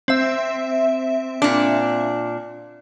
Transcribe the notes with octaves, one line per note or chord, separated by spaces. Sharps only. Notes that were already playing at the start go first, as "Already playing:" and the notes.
C4 E5
A#2 D4